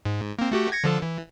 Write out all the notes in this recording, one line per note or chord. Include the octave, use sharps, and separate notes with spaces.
G#2
A#3 C4
A3 F#4 G4
G#6 A#6 C#7
D3 F3 A4
E3